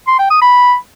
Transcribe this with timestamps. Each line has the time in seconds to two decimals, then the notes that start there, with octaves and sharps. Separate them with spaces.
0.07 C6
0.19 G5
0.30 D#6
0.42 B5